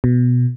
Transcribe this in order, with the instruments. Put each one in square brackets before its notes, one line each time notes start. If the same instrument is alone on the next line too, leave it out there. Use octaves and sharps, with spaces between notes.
[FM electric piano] B2